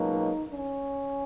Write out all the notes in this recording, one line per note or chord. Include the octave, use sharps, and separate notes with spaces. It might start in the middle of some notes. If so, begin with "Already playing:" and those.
Already playing: C#2 B2 F#3 A#3 D#4
C#4